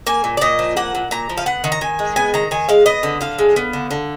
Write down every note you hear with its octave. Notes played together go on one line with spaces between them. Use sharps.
A#3 G#5
A#2
D5
A#2 D#5
F3
A#3 F#5
A#2
A#2 A#5
F3
F5
B3 F#5
D#3
A#5
D#3 G#5
G#3
B3 G#5
D#3 A#5
D#3 G#5
G#3 F5
B3 D#5
D3
D3 F5
G#3
B3
D3
D3